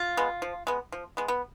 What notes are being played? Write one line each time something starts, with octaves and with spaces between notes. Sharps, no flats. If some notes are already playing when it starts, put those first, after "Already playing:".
Already playing: F4
G#3 B3
F3
G#3 B3
F3
G#3 B3
B3